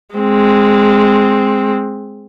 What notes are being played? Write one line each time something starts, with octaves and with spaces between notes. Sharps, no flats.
G#3 C4